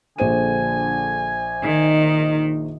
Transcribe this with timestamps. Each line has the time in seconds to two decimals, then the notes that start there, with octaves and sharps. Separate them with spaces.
0.18 A#1 D3 C5 G#5 D#7
1.63 D#3 D#4